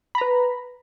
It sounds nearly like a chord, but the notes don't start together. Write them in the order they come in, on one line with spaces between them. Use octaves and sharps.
B5 A#5 B4